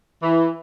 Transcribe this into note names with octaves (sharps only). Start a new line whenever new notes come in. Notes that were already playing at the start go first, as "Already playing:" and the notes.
E3